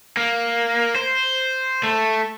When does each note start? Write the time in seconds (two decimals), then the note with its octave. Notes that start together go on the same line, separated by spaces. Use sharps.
0.17 A#3
0.96 C5
1.83 A3